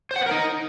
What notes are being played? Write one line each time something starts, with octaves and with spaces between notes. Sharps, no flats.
C5
F#5
B4
A#4
D#4